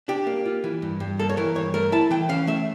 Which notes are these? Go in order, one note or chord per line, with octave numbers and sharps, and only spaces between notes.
D4 G4
A#3
F4
E3
G2
G2
A#3 A4
C#5
E3 A#4
G2 C#5
A3 A#4
E4 A5
E3 G5
C#4 F5
A3 E5